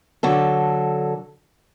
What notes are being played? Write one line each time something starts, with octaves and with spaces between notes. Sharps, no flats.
D3 F#3 A4